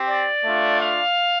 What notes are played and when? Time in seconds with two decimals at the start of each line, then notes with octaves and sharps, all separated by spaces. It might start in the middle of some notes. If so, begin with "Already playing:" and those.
Already playing: C4 G4
0.09 D5
0.45 A3 D4 F4
0.81 F5